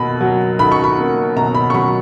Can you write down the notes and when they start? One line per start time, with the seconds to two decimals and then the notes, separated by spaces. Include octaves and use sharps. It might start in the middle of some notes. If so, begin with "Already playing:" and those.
Already playing: B1 B2 A#3 B5
0.21 F#3
0.59 B1 B5
0.72 C#6
0.84 B5
0.98 A#3
1.36 B2 A#5
1.55 B5
1.70 C#6
1.74 F#3 B5